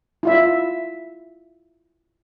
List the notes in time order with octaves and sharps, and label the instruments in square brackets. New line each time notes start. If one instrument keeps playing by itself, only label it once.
[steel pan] E4 F4 E5